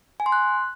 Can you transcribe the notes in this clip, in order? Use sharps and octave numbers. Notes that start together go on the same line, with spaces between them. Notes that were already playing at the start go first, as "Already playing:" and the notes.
G#5
C6
F#6